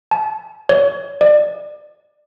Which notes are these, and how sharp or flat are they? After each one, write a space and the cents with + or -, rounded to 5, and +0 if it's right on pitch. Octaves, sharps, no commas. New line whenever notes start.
A5 -30
C#5 +30
D5 +25